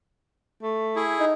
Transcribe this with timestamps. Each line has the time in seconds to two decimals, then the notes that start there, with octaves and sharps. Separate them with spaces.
0.63 A3
0.96 E4 G#4
1.20 D#4